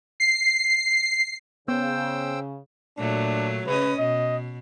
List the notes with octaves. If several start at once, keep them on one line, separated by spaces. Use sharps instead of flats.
C7
C#3 B3 C5 G5 E6
A#2 F#3 A3 D4
C#3 C#4 B4 D#5
B2 D#5